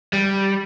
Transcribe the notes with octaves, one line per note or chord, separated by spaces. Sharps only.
G3